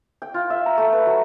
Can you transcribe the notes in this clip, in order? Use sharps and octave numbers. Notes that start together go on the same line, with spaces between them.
G5
F4
E5
A#5
A3
B4
F#3